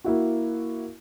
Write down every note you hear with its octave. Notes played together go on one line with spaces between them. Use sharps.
A#3 E4 F#4